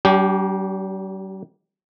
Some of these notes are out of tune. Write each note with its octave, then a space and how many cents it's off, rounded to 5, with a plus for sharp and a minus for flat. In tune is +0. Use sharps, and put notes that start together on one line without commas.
G3 -45 D4 -45 G4 +0